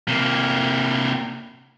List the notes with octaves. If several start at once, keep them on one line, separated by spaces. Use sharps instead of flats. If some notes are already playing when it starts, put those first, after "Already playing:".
C3 A#3